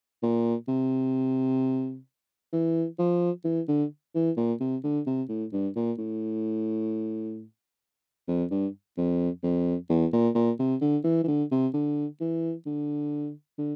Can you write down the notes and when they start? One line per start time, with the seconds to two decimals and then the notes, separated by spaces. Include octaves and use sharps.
0.23 A#2
0.68 C3
2.53 E3
2.99 F3
3.44 E3
3.68 D3
4.15 E3
4.37 A#2
4.60 C3
4.84 D3
5.06 C3
5.29 A2
5.52 G2
5.76 A#2
5.98 A2
8.28 F2
8.51 G2
8.97 F2
9.43 F2
9.90 E2
10.13 A#2
10.35 A#2
10.59 C3
10.81 D3
11.04 E3
11.24 E3
11.28 D3
11.51 C3
11.74 D3
12.20 E3
12.66 D3
13.58 D3